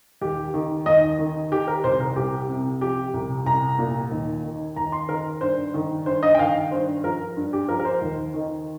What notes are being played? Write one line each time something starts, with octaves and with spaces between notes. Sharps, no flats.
D#2 G4
D#3
D#2 D#5
D#3
D#3 G4
A#4
C2 C5
A#4
C2 G4
C3
F3 G4
C2
C2 A#5
A#2
D#2
D#3
D#2 A#5
C6
D#3 A#4
G2 C5
D#3
G2 C5
D#5
G5
D#3 F5
G2 C5
F3 A#4
G2
G4
F3 A#4
A#4
C5
D#2
D#3